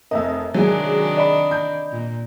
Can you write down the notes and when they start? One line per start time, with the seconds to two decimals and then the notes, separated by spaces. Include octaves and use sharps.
0.11 F1 F2 A#4 D#5 E5
0.54 C3 D#3 F#3 G#3 D4 G#4
1.17 D5 D#5 B5
1.51 G6
1.91 A#2